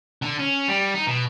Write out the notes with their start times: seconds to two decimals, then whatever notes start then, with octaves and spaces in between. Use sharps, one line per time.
0.22 D3
0.39 C#4
0.68 G3
0.94 D#4
1.07 B2